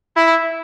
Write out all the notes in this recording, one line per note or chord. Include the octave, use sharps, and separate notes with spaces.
E4